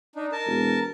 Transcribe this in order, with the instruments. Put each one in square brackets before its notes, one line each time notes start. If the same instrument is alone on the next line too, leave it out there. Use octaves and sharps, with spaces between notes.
[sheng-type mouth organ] D4 D#4
A#4 A5
[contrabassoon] E1